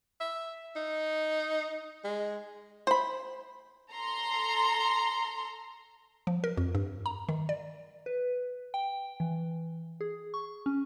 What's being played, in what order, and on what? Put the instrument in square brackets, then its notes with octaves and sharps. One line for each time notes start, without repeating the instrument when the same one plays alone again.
[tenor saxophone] E5
D#4
G#3
[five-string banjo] C5 B5
[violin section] A4 A#5 C6
[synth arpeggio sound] F3
A#4
F2
G2
A#5
D#3
D5
[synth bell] B4
G5
E3
G#4
C#6
C#4